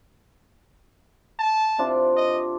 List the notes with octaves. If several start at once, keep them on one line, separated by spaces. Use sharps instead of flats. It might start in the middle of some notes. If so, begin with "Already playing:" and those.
A5
C3 D4 F4
D#5